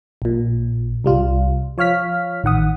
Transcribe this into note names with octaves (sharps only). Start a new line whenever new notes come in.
A#1 A#2
C2 G3 F4
F3 C#5 F5 F6 B6
A1 D#3 F#5 D#6